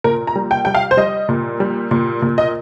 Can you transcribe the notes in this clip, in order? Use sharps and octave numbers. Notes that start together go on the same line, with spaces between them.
A#2 A#4
A#5
G3
G5
G3 G5
F5
C5
G3 D#5
A#2
G3
A#2
A#2
D#5